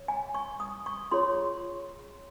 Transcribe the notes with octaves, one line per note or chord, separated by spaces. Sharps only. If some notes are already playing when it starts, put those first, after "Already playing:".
Already playing: C#5
G#5
C#6
D#6
C#6
F4 G#4 C#5 C6